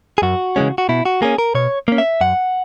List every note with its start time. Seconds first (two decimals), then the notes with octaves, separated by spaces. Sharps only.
0.18 G#4
0.22 F#2 F#4
0.56 C#3 E3 G#3 C#4
0.78 F#4
0.89 B2 E4
1.05 F#4
1.22 A#3 C#4 G#4
1.38 A#4
1.55 B2 C#5
1.88 A#3 C#4
1.98 E5
2.21 F#2 F#5